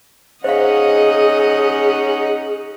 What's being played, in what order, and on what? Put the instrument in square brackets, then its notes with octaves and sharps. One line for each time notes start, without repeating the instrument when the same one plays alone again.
[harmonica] C#4 D#4 F#5 [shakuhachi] G#4 [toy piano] C5 F5 [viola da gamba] D#5